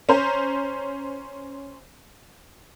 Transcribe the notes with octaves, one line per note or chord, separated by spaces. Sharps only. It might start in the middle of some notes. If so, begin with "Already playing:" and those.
C#4 C5 A#5